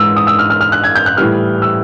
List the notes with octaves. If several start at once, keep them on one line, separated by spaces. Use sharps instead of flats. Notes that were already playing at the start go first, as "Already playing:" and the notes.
Already playing: G#2 E3 G#3 E6
D#6
E6
F6
F6
F6
F#6
G#6
G6
F#6
A2 E3 G3 F6
E6